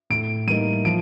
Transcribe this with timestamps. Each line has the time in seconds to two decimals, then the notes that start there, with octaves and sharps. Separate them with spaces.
0.10 A2 D7
0.47 G3 A#3 D#4 D#7
0.85 F3 D7